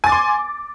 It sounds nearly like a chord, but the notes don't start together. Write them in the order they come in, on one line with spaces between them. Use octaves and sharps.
G#5 A6 D6 C6